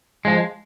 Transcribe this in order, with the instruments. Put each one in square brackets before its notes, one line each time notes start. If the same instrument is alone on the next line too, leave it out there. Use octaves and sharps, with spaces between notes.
[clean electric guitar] F3 G#3